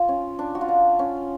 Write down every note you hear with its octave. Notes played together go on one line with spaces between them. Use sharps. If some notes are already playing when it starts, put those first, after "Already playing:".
Already playing: F4
C#4
D4
F#4
F4
D4
C#4